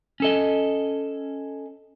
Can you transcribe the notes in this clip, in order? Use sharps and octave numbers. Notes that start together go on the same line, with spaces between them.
C#4 A4 D#5